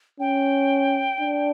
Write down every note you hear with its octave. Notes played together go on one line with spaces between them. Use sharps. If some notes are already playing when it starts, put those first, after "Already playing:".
C#4 G5
D4